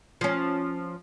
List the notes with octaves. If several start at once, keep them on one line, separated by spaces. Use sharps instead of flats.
F3 C#4